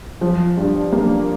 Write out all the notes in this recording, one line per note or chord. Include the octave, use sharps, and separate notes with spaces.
F3
G2
A#3